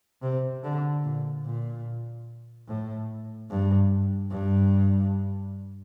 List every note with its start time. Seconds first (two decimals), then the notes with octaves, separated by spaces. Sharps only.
0.22 C3
0.63 D3
1.03 A#2
1.45 A#2
2.67 A2
3.50 G2
4.31 G2